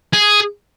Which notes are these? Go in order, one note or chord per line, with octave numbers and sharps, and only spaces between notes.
G#4